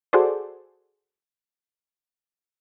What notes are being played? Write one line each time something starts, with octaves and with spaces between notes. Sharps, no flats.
F#4 G#4 A4 C5 D5